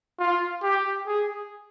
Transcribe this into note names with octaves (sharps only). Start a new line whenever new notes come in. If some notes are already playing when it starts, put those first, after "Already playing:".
F4
G4
G#4